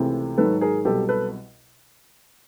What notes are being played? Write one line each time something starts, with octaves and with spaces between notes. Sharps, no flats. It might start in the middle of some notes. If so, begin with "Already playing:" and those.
Already playing: C#2 C3 E3 A3 C4
G#2 D#3 F#3 A4 B4
G#4 A#4
C2 B2 F#3 G4 A4
A4 B4